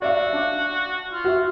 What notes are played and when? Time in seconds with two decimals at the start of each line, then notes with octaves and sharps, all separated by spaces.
0.02 F#4 D5 E5 F5
0.33 D4
1.11 F4
1.24 F#4 E5